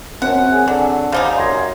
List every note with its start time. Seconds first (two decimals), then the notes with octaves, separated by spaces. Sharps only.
0.22 F#2 C4 F#5
0.52 G#4
0.68 D3 F#3
1.12 C#3 G3 D#4 C5 F5 F#5
1.38 F#2 C6 G#6 A#6